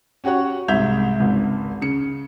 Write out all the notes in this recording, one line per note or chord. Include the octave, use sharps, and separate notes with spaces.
C#4 F#4 G4 C#5 F#5
C2 G#2 E5 G6 G#6 F7
G#1 C#2
C#3 C#7